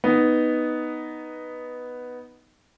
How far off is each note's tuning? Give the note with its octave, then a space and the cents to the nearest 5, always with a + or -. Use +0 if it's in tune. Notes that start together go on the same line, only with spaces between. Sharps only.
B3 +0 D#4 +0 D#5 +0